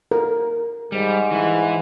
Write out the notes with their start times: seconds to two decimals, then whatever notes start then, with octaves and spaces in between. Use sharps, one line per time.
0.11 A#4
0.92 G#2 G3
1.32 E3 E4